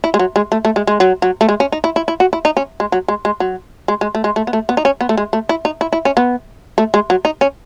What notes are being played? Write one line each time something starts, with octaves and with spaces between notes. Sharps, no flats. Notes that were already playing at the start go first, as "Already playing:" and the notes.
E4
G#3
F#3
G#3
A3
A3
G#3
G#3
F#3
F#3
A3
G#3
C#4
D#4
E4
E4
E4
F#4
E4
D#4
C#4
G#3
F#3
G#3
G#3
F#3
G#3
G#3
A3
G#3
A3
B3
A3
B3
D#4
C#4
B3
A3
G#3
A3
E4
D#4
E4
E4
C#4
B3
A3
G#3
F#3
D#4
C#4